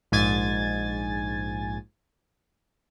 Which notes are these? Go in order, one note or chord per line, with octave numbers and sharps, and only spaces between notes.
A#1 G#2 G#5 G#6 A6